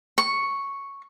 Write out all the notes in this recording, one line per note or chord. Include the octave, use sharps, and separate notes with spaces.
C#6